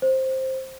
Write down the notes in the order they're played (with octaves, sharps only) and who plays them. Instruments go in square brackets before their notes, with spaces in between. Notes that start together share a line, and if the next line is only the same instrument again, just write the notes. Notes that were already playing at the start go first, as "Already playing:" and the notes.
[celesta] C5